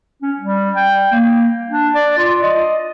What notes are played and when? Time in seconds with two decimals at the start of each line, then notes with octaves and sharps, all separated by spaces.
0.22 C#4
0.39 G3
0.76 G5
1.12 A#3
1.70 D4
1.95 D5
2.18 F4
2.42 D#5